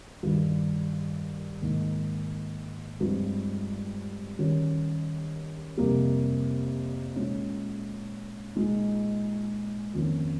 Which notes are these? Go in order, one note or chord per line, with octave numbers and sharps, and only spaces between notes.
G2 D#3 G3
G#2 D#3 A#3 D#4
G2 F3 G#3 C4
D#3 G3 C#4
F2 C3 G3 A#3
A#2 G#3 C#4
A#2 G#3 D#4
F2 D#3 A#3 C#4 F4